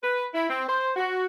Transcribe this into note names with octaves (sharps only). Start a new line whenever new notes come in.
B4
E4
C4
C5
F#4